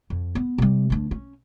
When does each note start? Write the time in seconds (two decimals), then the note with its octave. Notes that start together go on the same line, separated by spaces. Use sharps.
0.10 F2
0.35 B3
0.58 C3 G3
0.90 D2 D4
1.11 C#4